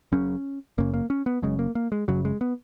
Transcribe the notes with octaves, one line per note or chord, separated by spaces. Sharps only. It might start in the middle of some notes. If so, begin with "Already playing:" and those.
F#1 F#2 C#3 C#4
F#1 F#2 C#3 A#3
A#3
C#4
B3
F#1 F#2 C#3 G#3
A#3
A#3
G#3
F#1 F#2 C#3 F#3
G#3
B3